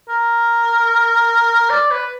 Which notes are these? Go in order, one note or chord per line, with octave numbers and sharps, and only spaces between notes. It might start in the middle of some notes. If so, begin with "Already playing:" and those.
A#4
D5
B4